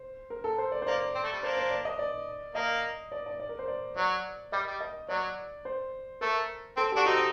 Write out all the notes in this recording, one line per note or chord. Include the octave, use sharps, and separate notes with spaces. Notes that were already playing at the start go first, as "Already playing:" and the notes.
Already playing: C5
A#4
A4
C5
D5
C5
A#3 D5
C4
A3
G3
A#3 D4 C5
C5
D5
D#5
D5
A#3 D#5
D5
D5
D5
A#4
C5
D5
F#3 D5
G3 D#5
G3
D#5
F#3 D5
C5
A3 A#4
C4 A4
D4 F#4 G4
C4 D#4 F#4